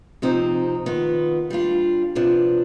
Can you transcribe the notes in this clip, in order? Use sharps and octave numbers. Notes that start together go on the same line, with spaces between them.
C3 F3 C4 D#4
D#3 B3 F4
G3 D4 F4
C3 F3 B3 D4